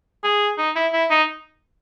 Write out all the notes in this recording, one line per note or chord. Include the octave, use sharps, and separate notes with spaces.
G#4
D#4
E4
E4
D#4